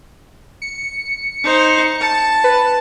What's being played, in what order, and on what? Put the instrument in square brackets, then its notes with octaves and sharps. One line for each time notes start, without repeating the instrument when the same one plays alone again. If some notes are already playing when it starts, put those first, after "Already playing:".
[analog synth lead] C#7
[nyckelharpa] D#4 C5
A5
[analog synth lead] B4